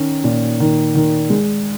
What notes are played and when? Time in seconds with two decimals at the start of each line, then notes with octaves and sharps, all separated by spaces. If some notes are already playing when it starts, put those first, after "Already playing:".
Already playing: D#3 C#4
0.24 A#2
0.60 D#3
0.95 D#3
1.30 G#3